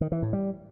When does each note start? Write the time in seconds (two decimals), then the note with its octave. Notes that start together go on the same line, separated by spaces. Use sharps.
0.01 D#3
0.12 E3
0.22 A2
0.33 G3